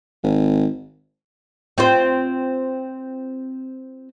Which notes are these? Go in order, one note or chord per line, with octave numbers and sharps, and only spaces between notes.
G#1
C4 F4 C5